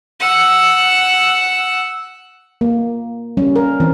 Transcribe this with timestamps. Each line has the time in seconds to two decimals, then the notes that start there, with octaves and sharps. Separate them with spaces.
0.20 F#5 E6
2.61 A#3
3.37 G3 C#4
3.56 A#4
3.80 E3 C4